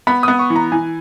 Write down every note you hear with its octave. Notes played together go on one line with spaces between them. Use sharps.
B3 B5
B3 D#6
C#6
E3
A#5
E3 G#5